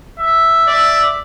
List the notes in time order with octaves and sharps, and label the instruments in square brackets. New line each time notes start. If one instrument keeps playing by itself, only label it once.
[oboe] E5
[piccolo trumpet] D5